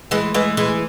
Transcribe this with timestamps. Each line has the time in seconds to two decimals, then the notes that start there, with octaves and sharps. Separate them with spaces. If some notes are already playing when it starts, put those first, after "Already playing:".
0.11 E3 G#3
0.34 E3 G#3
0.57 E3 G#3